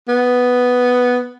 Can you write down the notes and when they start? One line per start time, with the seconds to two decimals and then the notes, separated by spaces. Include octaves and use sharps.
0.08 B3